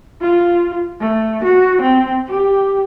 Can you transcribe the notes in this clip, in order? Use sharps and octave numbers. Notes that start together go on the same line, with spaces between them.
F4
A3
F#4
C4
G4